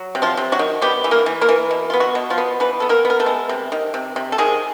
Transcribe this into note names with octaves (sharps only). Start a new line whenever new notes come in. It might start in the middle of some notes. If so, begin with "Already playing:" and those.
Already playing: F#3
C3
F3 F4
C3
F#3 F#4
D#3
G3 B3 G4
E3
A#3 A#4
E3
A#3 A#4
E3
B2
B3 F4
F#3 F#4
B2
F3 F4
B3
E3 B3 B4
B3 A4
A#3 A#4
B3
A#4
A3 A4
G#3
C3
D#3
C3
C3
A4
D#3 G#3 G#4